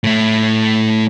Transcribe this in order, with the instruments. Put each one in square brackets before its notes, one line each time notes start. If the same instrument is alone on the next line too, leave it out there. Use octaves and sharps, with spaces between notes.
[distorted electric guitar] A2 A3